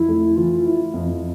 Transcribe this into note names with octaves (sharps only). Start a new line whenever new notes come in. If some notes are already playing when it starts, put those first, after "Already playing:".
Already playing: F2 E4
A3
E3 F4
E4
F2